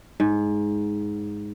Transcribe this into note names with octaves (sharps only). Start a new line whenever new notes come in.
G#2